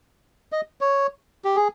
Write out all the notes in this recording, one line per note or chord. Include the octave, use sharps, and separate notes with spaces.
D#5
C#5
G4
G#4